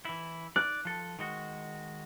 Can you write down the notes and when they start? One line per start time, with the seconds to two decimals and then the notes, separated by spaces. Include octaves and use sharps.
0.05 E3 E4
0.56 D5 F#6
0.85 F3 A4
1.19 D#3 G#3 F#4